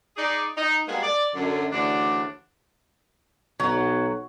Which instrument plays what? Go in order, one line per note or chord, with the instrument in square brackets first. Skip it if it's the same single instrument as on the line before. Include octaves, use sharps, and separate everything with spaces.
[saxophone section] D#4 G#4 D5
D#4
G3 G#3 A#3 B3 F#4 G#4
D5
F#2 D3
D2 C#3 E3 D4 F#4 D5
[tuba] B1 [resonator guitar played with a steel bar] F#3